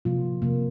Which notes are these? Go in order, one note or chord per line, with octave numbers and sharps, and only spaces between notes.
C3 F3 A#3 F4
C3 F3 A#3